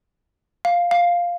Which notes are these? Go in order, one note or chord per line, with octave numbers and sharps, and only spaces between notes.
F5
F5